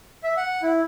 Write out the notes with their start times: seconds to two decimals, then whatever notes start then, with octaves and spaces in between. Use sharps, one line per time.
0.24 E5
0.37 F#5
0.63 E4